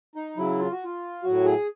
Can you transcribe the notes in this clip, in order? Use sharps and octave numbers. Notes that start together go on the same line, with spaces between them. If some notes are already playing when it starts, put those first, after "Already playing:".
D#4
C#3 F#3 E4
F4
F#4
F4
A2 F#3 F#4
G#4